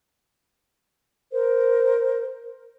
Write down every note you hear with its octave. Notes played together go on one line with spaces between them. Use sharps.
A#4 C5